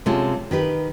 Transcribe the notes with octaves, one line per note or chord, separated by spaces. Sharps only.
C3 G#3 C#4 F4 A4
D#3 G4 B4